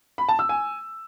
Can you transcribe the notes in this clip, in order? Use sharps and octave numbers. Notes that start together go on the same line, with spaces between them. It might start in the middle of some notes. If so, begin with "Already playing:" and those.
B5
A5
E6
G#5